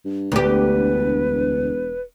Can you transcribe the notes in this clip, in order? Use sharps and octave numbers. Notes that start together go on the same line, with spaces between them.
G2
E1 D2 G4 B4